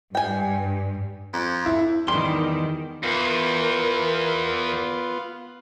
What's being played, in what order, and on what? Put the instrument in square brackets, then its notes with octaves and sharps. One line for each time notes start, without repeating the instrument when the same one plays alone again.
[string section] G2 [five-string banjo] G5 G#5
[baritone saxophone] F2
[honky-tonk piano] E4
[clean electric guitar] E2 G3 C6 [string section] D#3
[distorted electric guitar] E2 [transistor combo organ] B3 F4 [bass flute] A#4